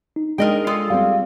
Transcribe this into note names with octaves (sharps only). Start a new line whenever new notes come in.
D#4
G#3 D4 A#4 D#5 G5
F4 G#4 A4
G3 C4 F5